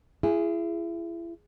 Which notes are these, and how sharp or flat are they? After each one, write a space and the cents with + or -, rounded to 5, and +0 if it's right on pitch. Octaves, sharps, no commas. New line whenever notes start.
E4 +35 G#4 +0